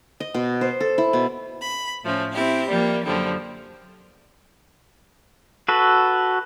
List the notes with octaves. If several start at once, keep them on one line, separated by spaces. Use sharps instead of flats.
D#5
B2
C5
A4
E4
B2
B5
A2 F3 A3 C#4
C4 E4 G4
F3 G3 A#3
F#2 D3 F3 G3
F#4 A4 B4